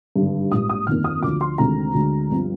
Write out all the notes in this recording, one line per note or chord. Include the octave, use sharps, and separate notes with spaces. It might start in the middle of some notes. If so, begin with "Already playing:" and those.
G#1 G2 D3 G3
A#1 G#2 G3 D#6
D#6
G1 F2 D#3 A#3 F6
D#6
D2 D3 F3 D6
C6
D2 C3 D#3 G#3 C4 A#5
D2 D3 G#3
G1 G2 F3 C4